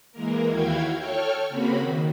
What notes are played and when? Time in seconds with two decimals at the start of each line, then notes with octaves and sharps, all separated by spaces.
0.12 E3 G#3 A#3 A#4
0.49 D#2 E4 F#4 F5 G5 G#6
0.98 A4 C#5 G5 C#6 F6
1.49 C#3 A#3 C4 F#4 B5
1.79 D#3